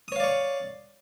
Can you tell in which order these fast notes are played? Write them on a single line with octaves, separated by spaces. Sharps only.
D#6 C#5 F5 D5 C#6